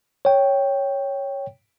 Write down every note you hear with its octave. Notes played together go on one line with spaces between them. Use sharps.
C#5 G5